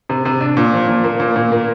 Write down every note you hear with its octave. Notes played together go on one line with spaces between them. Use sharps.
C3
C3
D4
A#2
F3
A#2
A#3
A#2
A#2
A#3